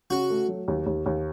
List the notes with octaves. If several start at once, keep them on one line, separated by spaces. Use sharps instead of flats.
C#3 F#4
A3
F#3
D#2
D#2
D#2